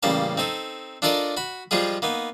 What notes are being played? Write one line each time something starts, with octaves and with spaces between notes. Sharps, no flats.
A1 C#3 G3 A#3 A5
C4 D#4 A4
D4 F4 A4 A#4 D5 D#5
F#4 B5
F3 G3 G#3 F4 G#4
A#3 B3 D#4